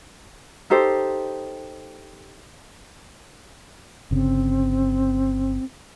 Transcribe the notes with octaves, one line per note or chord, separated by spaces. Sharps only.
D#4 G4 A4 C5
G1 C#3 C4